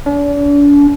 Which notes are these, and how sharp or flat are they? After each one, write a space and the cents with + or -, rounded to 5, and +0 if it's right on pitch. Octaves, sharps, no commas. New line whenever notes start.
D4 -40